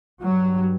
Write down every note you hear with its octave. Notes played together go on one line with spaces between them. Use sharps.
G2 F#3